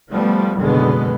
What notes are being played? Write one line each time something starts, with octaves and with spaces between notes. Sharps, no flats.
F3 G3 A3 B3
F#1 B2 D3 D#3 G#3 B3